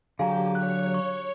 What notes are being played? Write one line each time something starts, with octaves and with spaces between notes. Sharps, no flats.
D3 F#3 G4 G#4 F5 G#5 A#5
C#5 F5 F#6
C#6